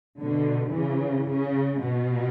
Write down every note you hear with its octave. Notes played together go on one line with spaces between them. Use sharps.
B2 D3
C#3 E3
C#3
B2